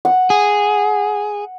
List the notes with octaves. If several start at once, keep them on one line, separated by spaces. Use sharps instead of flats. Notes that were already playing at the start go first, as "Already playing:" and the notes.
F#5
G#4